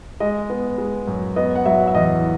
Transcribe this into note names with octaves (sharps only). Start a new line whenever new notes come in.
G#3 D#5
B3
G#3
F#2
B3 D#5
F#5
F#3 E5
E5
E2 D#5